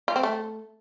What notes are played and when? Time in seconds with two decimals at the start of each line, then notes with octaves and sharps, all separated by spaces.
0.08 F4
0.16 C4
0.23 A3